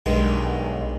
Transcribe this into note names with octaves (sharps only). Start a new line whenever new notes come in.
B1 G2 D#3 G#3